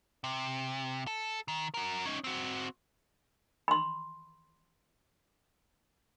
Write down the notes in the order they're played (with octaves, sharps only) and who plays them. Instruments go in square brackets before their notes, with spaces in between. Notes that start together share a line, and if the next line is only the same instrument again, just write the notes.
[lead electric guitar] C3
A4
D#3
F#4 A#4
C#4 D#4
C4 F#4
[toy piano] B5 C6